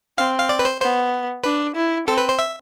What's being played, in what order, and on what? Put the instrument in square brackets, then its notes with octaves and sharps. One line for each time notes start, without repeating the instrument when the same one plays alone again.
[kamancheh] C4 [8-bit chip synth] F5
[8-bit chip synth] F5
D5
B4
C5
[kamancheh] B3 [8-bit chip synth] C5
[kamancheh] D4 [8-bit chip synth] B4
[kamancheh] E4
[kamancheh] C4 [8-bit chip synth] A4
[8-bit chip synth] B4
C5
E5